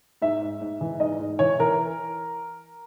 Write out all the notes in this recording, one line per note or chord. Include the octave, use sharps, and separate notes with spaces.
G#2 E5
G#2
G#2
E3
G#2 D#5
G#2
E3 C#5
E3 A#4